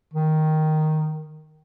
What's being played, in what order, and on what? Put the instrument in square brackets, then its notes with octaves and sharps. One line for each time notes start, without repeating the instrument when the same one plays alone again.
[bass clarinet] D#3